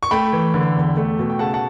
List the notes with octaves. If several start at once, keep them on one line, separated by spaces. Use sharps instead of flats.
C#6
A3 G5 B5
E3
D3
E2
A3
B2
G5
C#3 F#5 A5
F#5 A5